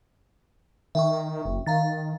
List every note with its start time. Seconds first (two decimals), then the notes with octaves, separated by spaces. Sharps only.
0.95 D#3 E5 G5 C#6
1.45 F#1
1.66 D#3 F5 A#5 A6